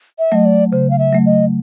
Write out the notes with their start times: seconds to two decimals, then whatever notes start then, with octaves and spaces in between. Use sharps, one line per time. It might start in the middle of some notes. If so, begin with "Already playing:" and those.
0.19 E5
0.32 F#3 A3 D#5
0.45 D5
0.72 C#3 C5
0.90 F5
0.99 E5
1.13 F#3 A3
1.26 D#5